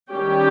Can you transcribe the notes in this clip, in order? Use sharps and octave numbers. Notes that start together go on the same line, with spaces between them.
D#3 G3 C#4 G4